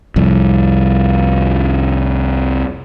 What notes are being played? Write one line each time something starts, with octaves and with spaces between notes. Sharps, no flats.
C2 F2